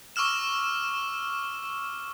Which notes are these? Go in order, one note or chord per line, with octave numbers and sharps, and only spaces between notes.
C#6 D6 E6 F6 E7